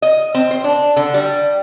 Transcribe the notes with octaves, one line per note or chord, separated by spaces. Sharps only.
D#5
C4
C5
D4
D3
G3